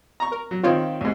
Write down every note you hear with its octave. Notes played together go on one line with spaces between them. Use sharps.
A#5 C#6
A#4
F#3
D#3 C4 F4 C#5
C2 G#2